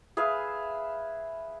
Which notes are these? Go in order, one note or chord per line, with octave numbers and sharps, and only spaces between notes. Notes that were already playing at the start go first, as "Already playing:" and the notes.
G#4 B4 E5 F5